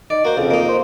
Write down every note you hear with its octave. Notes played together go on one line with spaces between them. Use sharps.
D#4 D5
A#3 F#4 C5
F2 C#3
A#3 D#4
C5